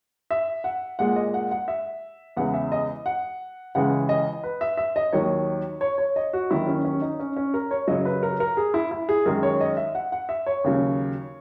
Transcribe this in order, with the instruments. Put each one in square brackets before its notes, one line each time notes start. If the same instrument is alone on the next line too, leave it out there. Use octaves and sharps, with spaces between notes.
[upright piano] E5
F#5
A#2 G#3 F#5
D#5
F#5
F#5
E5
E2 C#3 E3 G#3 F#5
E5
D#5
F#5
C#2 C#3 E3 G#3 F#5
D#5
B4
E5
E5
D#5
D#2 D#3 F#3 C#5
C#5
C#5
D#5
F#4
D#2 D#3 F#3 E4
C#4
C#4
D#4
C#4
C#4
A#4
C#5
F#2 C#3 F#3 D#5
B4
A#4
A#4
G#4
E4
E4
G#4
F#2 D#3 G#3 A#4
C#5
D#5
E5
F#5
F#5
E5
C#5
D#2 C#3 F#3